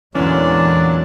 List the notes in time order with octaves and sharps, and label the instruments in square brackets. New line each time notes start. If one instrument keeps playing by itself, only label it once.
[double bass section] E2 G#3 [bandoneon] A#2 D3 F#3 [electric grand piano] E3 C#4 [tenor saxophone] D4